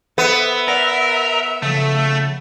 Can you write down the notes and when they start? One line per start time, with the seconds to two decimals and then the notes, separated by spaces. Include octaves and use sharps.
0.18 B3 A4 C5 E5
0.68 A#4 D5 F#5
1.62 C#3 F3 A3